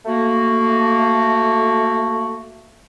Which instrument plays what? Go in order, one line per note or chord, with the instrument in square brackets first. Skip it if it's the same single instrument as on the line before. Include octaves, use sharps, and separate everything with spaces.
[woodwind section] A3 A#3 F#4